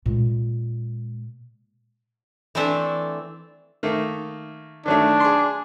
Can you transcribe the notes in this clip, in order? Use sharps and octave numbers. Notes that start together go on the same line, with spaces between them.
A#2 G#3
E3 A3 C4 D4 A4 E5
D#3 A3 A#3
D#3 F#3 A3 D4
G#4 C6